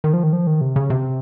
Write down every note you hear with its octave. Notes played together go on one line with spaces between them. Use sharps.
D#3
F3
D#3
F3
D#3
C3
C#3
C3